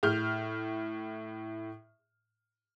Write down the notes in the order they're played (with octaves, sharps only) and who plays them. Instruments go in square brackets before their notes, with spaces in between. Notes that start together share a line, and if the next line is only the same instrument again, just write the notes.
[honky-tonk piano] A2 F6 G6